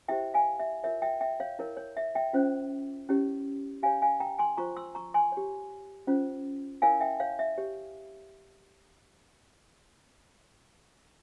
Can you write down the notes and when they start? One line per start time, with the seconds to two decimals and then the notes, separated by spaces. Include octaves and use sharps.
0.08 E4 G4 C5 E5 G5
0.34 F5 G#5
0.59 E5
0.84 F4 A#4 C#5 E5
1.02 E5 G5
1.21 E5 G5
1.40 C#5 F5
1.59 E4 A#4 C#5
1.77 C#5
1.97 E5
2.15 E5 G5
2.33 C#4 F4 C5
3.09 C#4 E4 G4 C#5
3.83 G4 C#5 F5 G#5
4.02 F5 G#5
4.20 G5 A#5
4.39 G#5 C6
4.57 F4 C5 A#5 C#6
4.76 C6 E6
4.95 A#5 C#6
5.14 G#5 C6
5.32 G4 C#5
6.07 C#4 F4 C5
6.82 E4 A#4 C#5 F5 G#5
7.00 E5 G5
7.20 C#5 F5
7.39 E5
7.58 G4 C#5